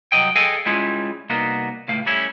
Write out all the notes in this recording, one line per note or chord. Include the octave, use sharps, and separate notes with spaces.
C2 F#3 D#5 G5
G#4 A4 D#5 F5 G5 G#5
G3 G#3 C#4 E4 F4 G#4
C2 A#3 B3 D#4 F#4
C#2 A2 A3 F5
G3 A3 C#4 E4